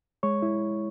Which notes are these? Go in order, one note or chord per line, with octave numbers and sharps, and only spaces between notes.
G#3 C#5 C#6
E4